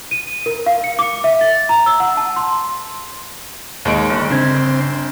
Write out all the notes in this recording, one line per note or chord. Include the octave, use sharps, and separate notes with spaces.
D#7
A#4
F5
C#7
D6
E5
A6
A#5
E6
F#5
A5
C6
D#2 G#3 D7
G1
C#3 C4 D4 G#6